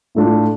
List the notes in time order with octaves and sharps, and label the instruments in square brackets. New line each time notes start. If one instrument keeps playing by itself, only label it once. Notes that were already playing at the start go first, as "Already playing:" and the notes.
[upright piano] A2 A3 D4 F4